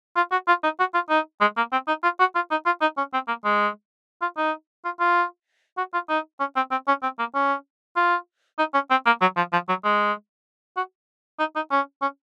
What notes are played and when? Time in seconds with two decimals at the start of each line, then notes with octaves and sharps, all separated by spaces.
0.17 F4
0.32 F#4
0.48 F4
0.64 D#4
0.80 F#4
0.94 F4
1.10 D#4
1.41 G#3
1.57 A#3
1.73 C4
1.88 D#4
2.03 F4
2.20 F#4
2.35 F4
2.51 D#4
2.66 F4
2.82 D#4
2.98 C#4
3.14 C4
3.28 A#3
3.45 G#3
4.22 F4
4.37 D#4
4.85 F4
5.00 F4
5.78 F#4
5.94 F4
6.09 D#4
6.40 C#4
6.56 C4
6.71 C4
6.88 C#4
7.03 C4
7.19 A#3
7.35 C#4
7.97 F4
8.59 D#4
8.74 C#4
8.91 C4
9.06 A#3
9.22 F#3
9.37 F3
9.53 F3
9.69 F#3
9.84 G#3
10.77 F#4
11.39 D#4
11.56 D#4
11.71 C#4
12.02 C#4